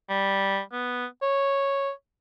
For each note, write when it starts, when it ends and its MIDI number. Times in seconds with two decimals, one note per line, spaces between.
0.09 0.60 55
0.72 1.06 59
1.22 1.91 73